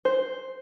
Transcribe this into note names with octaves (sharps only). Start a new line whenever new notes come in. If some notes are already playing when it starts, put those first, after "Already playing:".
C5